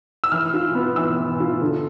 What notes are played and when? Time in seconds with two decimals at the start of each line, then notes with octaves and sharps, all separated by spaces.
0.24 E6
0.32 E3 F6
0.54 F4
0.75 B3
0.96 E3 E6
1.18 E3
1.40 F4
1.62 D3